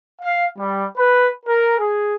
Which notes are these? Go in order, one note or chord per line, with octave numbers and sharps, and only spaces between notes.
F5
G3
B4
A#4
G#4